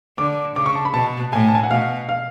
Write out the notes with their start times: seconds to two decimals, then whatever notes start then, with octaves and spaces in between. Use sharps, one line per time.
0.18 D3 D6
0.56 C#3 D6
0.66 C#6
0.75 A5
0.85 B5
0.94 B2 A5
1.32 A2 G#5
1.48 A5
1.55 G#5
1.63 F#5
1.71 B2 F5
2.09 F5